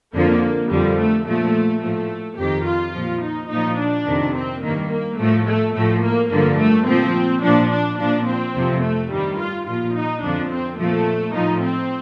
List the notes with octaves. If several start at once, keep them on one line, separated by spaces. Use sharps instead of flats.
F2 D3 F3 A#3
F2 D3 F3 G3
A3
A#2 F3 A3
A2 F3 A3
F2 D#3 G4
F4
A#2 F3
D#4
A#2 F3 D#4
D4
F2 C3 D#3
C4
G2 D#3 A#3
A#3
A2 F3 A3
A3
A2 F3 A3
A#3
G2 D3 F3 A#3
A3
A#2 F3 C4
A#2 F3 D4
D4
A#2 F3 D4
C4
F2 C3 F3
A3
G2 D#3 G3
F4
A#2 F3 F4
D#4
F2 D3 F3 D4
C4
A#2 F3 A3
A2 F3 D#4
C4